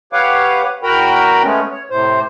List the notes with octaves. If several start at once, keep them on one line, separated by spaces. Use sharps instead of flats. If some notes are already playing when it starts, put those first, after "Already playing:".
G4 B4 C#5 F5 F#5 D6
E2 F#4 A#4 G5 A#5 B5
G#3 A3 B3 C#4
C#5
A2 C3 C5